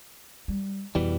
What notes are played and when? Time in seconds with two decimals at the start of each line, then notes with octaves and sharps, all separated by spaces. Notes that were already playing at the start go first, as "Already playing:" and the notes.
0.48 G3
0.95 F2 B2 E3 G3